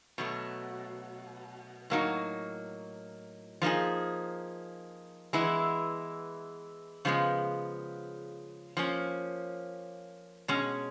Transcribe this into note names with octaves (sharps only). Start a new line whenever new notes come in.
B2 F#3 A3
A2 F#3 A#3 D#4 F#4
F3 A#3 D#4 G#4
E3 G#3 B3 E4
C#3 F3 G#3 B3
F3 A#3 C#4
B2 G#3 C#4